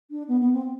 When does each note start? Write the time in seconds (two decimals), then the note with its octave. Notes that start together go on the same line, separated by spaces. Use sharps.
0.11 D4
0.28 B3
0.41 B3
0.53 C4